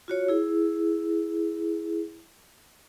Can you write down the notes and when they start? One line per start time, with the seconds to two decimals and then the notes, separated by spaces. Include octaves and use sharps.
0.08 F4 F#4 C#5
0.28 E4 G#4